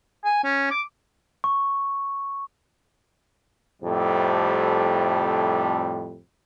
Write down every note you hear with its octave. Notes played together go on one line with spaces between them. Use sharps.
G#5
C#4
D6
C#6
F2 A2 C3 G3